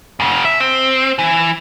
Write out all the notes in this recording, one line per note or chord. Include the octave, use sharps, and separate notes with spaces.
F#2 C#3
E5
C4
E3